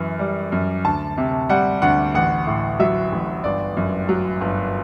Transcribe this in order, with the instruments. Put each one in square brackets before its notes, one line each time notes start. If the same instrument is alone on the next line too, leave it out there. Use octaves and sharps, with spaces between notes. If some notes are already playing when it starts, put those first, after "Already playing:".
Already playing: [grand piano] F#2 E3
G3
F#2
D2 A5
C3
G3 F#5
D2 F#5
A1 F#5
A2
F#3 E5
A1
G1 D5
F#2
F#3
G1